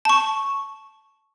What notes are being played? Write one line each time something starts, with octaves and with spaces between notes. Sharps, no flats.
A5 C#6